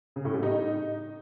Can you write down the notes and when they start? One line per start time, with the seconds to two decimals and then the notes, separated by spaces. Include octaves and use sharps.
0.16 C#3
0.25 A2
0.34 G3
0.43 D#4